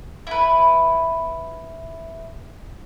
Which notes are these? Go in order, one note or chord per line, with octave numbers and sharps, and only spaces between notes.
E4 B4